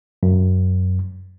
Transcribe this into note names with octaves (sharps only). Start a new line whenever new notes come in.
F#2